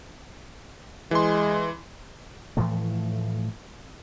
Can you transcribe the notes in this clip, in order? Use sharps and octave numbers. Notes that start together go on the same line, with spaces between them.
E3 G#3 C6
A2 E3 F3 A3